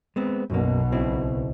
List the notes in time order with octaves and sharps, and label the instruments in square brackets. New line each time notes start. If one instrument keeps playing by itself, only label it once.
[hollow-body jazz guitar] G#3 B3 C4
[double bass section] B1 B2 [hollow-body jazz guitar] F#2 A#3
[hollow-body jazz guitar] C#2 C4 E4